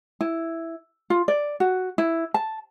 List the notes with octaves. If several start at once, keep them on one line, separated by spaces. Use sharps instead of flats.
E4
F4
D5
F#4
E4
A5